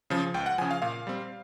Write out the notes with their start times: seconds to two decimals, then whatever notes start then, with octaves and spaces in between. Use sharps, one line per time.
0.10 C#3 F3
0.34 C#2 G5
0.46 F#5
0.58 C#3 F3 G#5
0.71 F5
0.82 A#2 F5
1.07 G3 C4